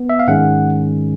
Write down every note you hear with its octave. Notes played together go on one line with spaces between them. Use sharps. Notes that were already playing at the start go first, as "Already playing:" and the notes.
Already playing: B3
E5
F5
G#2 D#3 G#3 C#4 F#5